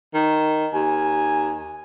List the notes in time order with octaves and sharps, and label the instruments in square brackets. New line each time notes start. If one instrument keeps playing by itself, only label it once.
[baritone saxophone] D#3
[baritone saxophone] D#2 [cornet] G#5